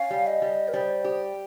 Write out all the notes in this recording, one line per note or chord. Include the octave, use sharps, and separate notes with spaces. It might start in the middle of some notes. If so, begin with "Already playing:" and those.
Already playing: C#4 F5
G3
D#5
G3
A#4
G3 C5
G4